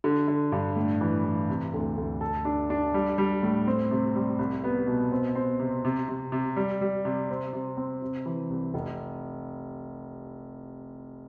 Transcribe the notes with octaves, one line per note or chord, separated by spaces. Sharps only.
D3
D3
G2
A2
E3
E3
C3
D2
D2
A4
D4
D4
G3
G3
A2
C4
C3
G3
C2
B3
B2
C4
C4
C3
C3
C3
C3
G3
G3
C3
C4
C3
C4
C3
E3
C2
F1